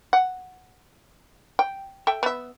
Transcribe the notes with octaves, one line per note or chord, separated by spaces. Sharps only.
F#5
G5
A4 E5 G5
B3 E5